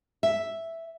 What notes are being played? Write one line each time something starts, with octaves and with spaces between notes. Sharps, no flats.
E5